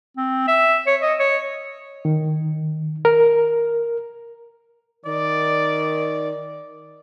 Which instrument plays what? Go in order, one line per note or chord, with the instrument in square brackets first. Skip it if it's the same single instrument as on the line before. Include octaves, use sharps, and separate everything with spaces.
[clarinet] C4
E5
C#5
D#5
C#5
[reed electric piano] D#3
A#4
[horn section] D#3 D5